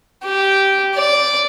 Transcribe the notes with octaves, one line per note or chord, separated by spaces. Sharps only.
G4
D5